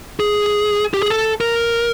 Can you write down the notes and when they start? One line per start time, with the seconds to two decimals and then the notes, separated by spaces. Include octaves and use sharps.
0.20 G#4
0.94 G4
1.02 G#4
1.10 A4
1.41 A#4